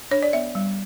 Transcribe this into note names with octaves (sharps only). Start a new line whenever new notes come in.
D4 C#5
D5
B3 E5
G3